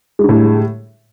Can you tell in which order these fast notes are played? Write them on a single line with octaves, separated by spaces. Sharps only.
G#3 D3 A2 G3